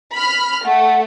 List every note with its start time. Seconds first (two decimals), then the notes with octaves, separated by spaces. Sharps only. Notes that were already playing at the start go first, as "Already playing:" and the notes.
0.15 B5 F6
0.65 A3 F#5